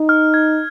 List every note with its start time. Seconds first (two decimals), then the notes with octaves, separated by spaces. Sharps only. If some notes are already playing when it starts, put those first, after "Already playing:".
Already playing: D#4
0.09 F6
0.34 G#6